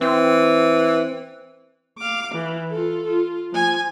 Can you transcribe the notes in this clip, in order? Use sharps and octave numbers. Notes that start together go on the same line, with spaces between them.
E3 C4
F5 D6
E3
F4 A4
F4
F3 G#5